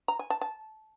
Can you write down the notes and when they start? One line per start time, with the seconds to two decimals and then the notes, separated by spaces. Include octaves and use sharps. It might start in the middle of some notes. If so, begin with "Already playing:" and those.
0.08 A#5
0.19 G#5
0.30 A5
0.41 A5